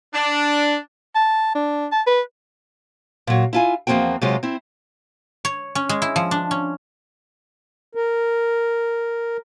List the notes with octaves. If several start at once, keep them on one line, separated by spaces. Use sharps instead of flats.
D4
A5
D4
A5
B4
A#2 F#3
E4 F4 G#5
E2 F3 A#3 C4 F#4 G5
C3 F#3 G#3 F4
C4 E4
C#5
C#4
G#3
E4
F3
D4
C#4
A#4